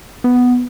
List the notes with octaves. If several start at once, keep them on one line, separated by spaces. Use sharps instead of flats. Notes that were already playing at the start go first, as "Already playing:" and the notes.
B3